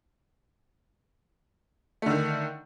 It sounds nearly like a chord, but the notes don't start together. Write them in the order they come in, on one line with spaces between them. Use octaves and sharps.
A3 D3 D#3